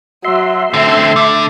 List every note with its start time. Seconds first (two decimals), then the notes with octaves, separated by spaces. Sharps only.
0.25 F#3 E5 C6
0.74 D3 A3 C4
1.16 D3